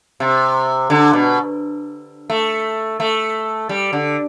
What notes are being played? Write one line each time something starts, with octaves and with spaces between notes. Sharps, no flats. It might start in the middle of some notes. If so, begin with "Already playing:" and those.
C3
D3
B2
A3
A3
G3
D3